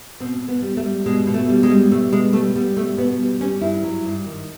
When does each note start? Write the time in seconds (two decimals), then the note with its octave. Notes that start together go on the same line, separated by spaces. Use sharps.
0.20 B2 C4
0.41 B2
0.48 B3
0.62 G3
0.77 A3
0.84 G3
1.06 B2 G#3
1.27 B2
1.34 A3
1.49 G3
1.63 G#3
1.70 G3
1.91 B2 A3
2.12 B2 G#3
2.33 G3 A3
2.55 G3 B3
2.76 B2 A3
2.97 B2 B3
3.19 G3
3.40 G3 C#4
3.61 G2 E4
3.83 F#3
4.05 G2
4.26 D#3